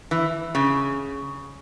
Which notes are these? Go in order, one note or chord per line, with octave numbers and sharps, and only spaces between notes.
E3
C#3